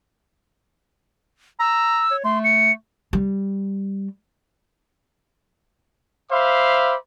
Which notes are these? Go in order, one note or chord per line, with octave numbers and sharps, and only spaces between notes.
A#5 E6
C#5
A3 C6
C#7
G3
C5 E5 F5 B5 D6